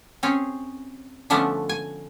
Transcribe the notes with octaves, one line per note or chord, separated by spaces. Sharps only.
C4 C#4 G#4 C#5
D3 F3 A3 B3 C#4 D4
G#5